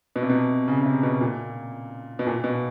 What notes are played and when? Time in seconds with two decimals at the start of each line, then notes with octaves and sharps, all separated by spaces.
0.16 B2
0.23 C3
0.30 B2
0.68 C#3
0.81 C#3
0.86 C3
1.03 B2
1.21 A#2
2.19 B2
2.27 A#2
2.44 B2